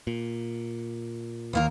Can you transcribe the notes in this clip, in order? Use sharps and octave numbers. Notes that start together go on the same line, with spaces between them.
A#2
D#2 A#3 A#4